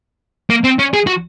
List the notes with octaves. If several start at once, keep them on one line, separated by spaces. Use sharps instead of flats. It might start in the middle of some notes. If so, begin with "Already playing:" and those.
A#3
C4
C#4
G#4
F#4